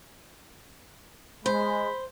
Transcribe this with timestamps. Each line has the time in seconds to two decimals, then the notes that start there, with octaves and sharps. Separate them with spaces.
1.46 G#3 C5 B5